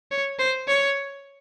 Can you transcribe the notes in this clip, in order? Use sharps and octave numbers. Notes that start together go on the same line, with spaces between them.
C#5
C5
C#5